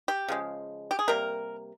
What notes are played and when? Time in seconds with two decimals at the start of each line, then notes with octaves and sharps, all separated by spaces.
0.08 G4
0.28 C#3 F3 G#3
0.91 G4
0.99 G#4
1.08 C3 G3 A#3 A#4